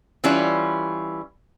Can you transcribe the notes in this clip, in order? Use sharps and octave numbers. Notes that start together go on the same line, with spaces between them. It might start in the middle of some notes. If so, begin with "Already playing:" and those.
E3 G3 C#4 E4 F4